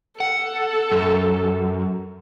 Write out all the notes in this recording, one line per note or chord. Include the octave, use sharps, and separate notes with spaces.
A4 F#5
F#2